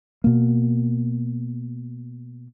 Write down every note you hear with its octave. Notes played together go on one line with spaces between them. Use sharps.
B2 A#3